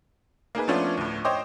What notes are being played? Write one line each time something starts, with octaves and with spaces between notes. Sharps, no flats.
A#3 D#4 G#4 B4
F3 A3 B3 C#4 D4 F4
D2 A2
C5 C#5 D#5 G5 C6 D6